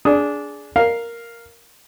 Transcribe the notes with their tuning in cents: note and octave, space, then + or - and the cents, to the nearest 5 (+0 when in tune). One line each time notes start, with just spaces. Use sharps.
D4 -15 G#4 +10 D#6 +0
A#4 +0 F5 +0